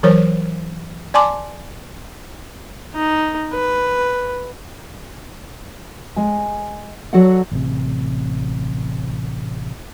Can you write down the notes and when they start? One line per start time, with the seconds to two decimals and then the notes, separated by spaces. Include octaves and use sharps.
0.03 E3 F#3 A#4 C5 C#5
1.14 D5 G#5 A5 C6 D6
2.95 D#4
3.53 B4
6.16 G#3 G#5
7.13 F#3 F#4 A4 D5 F#5
7.52 A1 C3